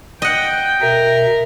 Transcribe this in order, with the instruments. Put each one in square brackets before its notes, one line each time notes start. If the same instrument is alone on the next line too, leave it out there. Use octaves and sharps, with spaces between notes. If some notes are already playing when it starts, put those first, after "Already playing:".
[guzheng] D#5 F#5 [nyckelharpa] G5
[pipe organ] B2 E5 [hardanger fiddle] A#4